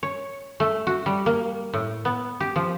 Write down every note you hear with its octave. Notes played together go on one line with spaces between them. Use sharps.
C#5
A3
F#4
G3
A#3
A2
B3
G4
F3